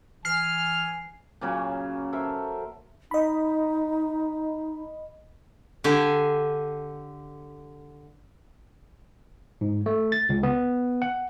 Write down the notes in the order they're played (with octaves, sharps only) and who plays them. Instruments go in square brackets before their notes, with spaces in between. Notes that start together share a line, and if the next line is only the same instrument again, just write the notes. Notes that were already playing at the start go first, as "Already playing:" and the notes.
[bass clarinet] E3 [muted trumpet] G#5 [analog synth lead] F6 [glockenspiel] C7
[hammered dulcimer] A#2 C#3 F#3 C#4
A4 A#4 C5 E5
[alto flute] D#4 [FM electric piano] D#5 B5
[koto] D3 G4 G#5
[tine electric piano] G#2
A3
A6
C#2
B3
F#5